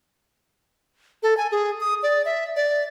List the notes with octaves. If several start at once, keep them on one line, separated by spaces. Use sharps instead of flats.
A4
G#5
G#4
D#6
D5
E5
D5